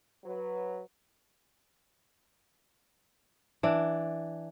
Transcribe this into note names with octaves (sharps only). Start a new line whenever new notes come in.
F#3 B4
E3 D4